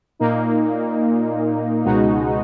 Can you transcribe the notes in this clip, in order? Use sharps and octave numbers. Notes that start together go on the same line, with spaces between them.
A#2 A#3 D#4
C#2 B2 G#3 D#4 F#4